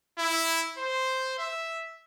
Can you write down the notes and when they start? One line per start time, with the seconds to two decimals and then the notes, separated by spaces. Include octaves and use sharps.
0.18 E4
0.78 C5
1.38 E5